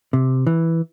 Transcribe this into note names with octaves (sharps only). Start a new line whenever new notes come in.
C3
E3